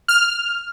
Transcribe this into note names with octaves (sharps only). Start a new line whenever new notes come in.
F6